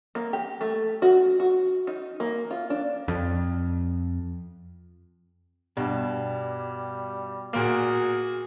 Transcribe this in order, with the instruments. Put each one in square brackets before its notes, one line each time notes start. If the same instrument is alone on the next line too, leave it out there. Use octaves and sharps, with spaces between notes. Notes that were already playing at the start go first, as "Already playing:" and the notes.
[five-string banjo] A#3
G4
A3
F#4
F#4
D#4
A#3
F4
D4
[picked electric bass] F2
[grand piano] G2 [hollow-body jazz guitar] B2 [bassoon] G3
[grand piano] A#2 A#3 [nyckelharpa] F#4 G#4